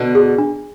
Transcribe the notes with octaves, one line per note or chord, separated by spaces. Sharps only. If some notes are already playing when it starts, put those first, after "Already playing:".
Already playing: B2 D3
G#4
D4